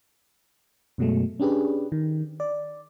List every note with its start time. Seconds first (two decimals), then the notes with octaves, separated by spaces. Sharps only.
0.98 F#2 B2 F#3 G#3 A3
1.40 C#4 D4 G4 G#4 B4
1.92 D#3
2.40 D5